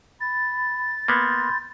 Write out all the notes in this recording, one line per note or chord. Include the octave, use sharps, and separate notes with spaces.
B5 A6
A#3 B3 B5 C6 G6